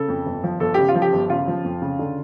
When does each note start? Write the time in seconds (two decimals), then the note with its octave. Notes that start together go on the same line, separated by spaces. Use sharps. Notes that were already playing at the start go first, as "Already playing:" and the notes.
Already playing: C#3 A4
0.08 F2
0.26 G1
0.44 F3
0.60 G1 A4
0.74 C#3 G4
0.88 F4
0.95 F3
1.02 G4
1.13 G1
1.30 C#3 F4
1.47 F3
1.64 F2
1.82 C#3
1.99 D3